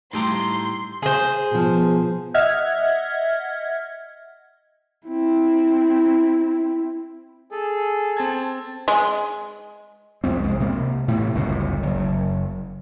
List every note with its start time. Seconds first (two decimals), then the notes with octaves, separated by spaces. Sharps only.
0.13 A2 G3 A3 D#4 G4 A#5 C6
1.02 G#4 C5
1.51 B2 F3
2.34 D#5 E5 F#5 F6 G#6
5.08 C4 E4
7.52 G#4 A4
8.17 C4 A5 G#6
8.88 G#3
10.24 C2 F2 G#3 C4
10.44 C2 G#3
10.60 C3 A#3
11.08 A2 C3 E3
11.35 G1 C#2 F#2 A2
11.83 F#1